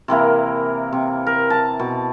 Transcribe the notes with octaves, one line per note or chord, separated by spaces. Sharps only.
C3 E3 A#3 A#4
C3
A#4
A5 A#5
B2